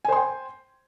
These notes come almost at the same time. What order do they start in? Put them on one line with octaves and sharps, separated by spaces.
G#5 C5 C6 G5